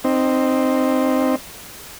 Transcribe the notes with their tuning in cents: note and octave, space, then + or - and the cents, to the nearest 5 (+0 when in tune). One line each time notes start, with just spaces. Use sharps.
C4 +0 D#4 -15